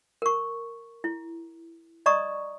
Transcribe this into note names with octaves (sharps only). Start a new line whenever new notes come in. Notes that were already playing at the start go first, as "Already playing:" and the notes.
A#4 C#6
E4
D5 D#5 A#5 C#6 D#6